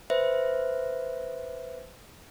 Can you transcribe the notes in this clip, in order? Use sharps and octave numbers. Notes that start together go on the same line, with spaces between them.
B4 C5 E5